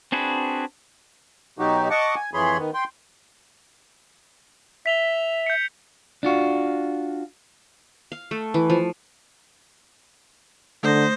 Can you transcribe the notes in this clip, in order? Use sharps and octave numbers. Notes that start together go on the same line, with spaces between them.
C4 D4 F#4 G#4 B4
B2 F#3 D#4 F#4 G4
D#5 F#5 A5 C#6 D6
G#5
F2 E3 G#4 C#5 B5 C6
D#3 B3
G5 C6
E5 B6 F7 G7
G6 C#7
D4 F4 F#4
F5
A3
E3
F3
D3 A3 C5 D#6 A#6